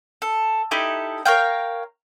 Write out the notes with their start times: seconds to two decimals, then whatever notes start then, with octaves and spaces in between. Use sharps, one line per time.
0.22 A4
0.71 D#4 E4 G4 A4
1.25 A#4 C#5 F5 G5